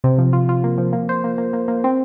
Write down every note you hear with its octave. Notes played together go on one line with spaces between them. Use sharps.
C3
F3
F4
F4
A#3
F3
A#3
C5
A#3
A#3
A#3
A#3
C4